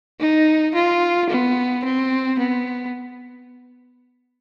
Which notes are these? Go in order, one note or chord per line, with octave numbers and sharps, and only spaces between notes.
D#4
F4
B3
C4
B3